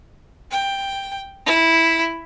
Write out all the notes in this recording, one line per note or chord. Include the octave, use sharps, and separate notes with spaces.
G5
E4